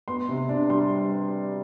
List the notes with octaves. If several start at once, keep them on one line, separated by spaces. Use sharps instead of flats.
B3 C6
C3
D4
G3 C6